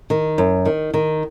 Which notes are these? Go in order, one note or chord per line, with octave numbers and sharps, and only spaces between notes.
D#3
F#2
D#3
D#3